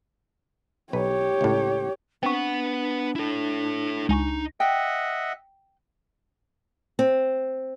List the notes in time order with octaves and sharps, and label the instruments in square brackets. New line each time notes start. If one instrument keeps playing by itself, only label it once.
[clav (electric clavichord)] B1 B4 [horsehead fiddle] G4 C#5
[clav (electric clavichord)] C#2 A2
[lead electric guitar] B3 F#5 [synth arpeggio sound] C4 C#6 [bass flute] D4
[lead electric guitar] E4 A4
[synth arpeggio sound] C#2 G#5 C#6 [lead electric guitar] D#4
[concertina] D#5 E5 F#5 [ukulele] G5
[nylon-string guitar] C4